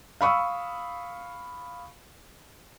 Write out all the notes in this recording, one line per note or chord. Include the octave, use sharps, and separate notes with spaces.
F5 B5 C#6 D#6 E6